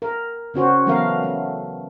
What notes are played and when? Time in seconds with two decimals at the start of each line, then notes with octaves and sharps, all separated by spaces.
0.02 A#4
0.54 C#3 C#4 F#4 C5
0.86 E3 F#3 A3 B3 A#4 F5
1.23 A3